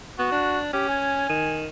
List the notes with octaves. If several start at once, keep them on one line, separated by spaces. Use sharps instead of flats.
B3 F#4
D4
C#4 G4
G#5
D#3